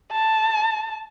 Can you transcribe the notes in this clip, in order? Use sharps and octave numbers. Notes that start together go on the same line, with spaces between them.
A5